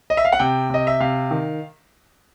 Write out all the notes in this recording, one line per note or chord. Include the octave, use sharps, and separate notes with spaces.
D#5
E5
F5
F#5
C3 G5
C3 D#5
E5
C3 F5
D#3